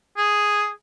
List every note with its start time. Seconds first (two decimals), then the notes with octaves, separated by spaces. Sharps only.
0.17 G#4